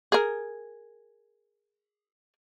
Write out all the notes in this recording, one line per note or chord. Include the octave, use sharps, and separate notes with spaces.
G#4 A#4